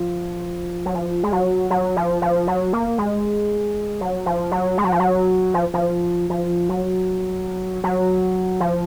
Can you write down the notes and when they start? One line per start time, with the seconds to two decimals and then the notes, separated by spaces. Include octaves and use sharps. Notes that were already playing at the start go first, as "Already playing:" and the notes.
Already playing: F3
0.86 F#3
0.94 F3
1.23 G#3
1.32 F#3
1.70 F#3
1.97 F3
2.22 F3
2.47 F#3
2.73 A#3
2.98 G#3
4.01 F#3
4.26 F3
4.52 F#3
4.78 G#3
4.84 F#3
4.92 F3
5.00 F#3
5.54 F3
5.74 F3
6.30 F3
6.69 F#3
7.84 F#3
8.60 F3